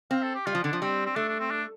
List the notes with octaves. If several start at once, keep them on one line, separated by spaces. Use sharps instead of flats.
C4 F5
A4
G4
G3 F4
F3
D3 D4
F3
G3 C4
C4
A3 D4
D4
C4
D4